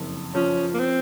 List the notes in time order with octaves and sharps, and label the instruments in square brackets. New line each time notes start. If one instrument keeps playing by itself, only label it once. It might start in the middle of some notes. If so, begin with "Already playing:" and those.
Already playing: [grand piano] F#1 F2
[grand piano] F3 [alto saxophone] C#4
[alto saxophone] A#3
C4